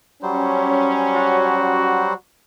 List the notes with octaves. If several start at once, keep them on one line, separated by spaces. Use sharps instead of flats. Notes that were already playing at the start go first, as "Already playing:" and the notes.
F#3 G3 C#4 C5
F#4